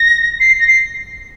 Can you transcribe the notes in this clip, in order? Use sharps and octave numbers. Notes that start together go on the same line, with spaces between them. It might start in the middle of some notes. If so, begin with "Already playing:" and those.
Already playing: A#6
C7
A#6
C7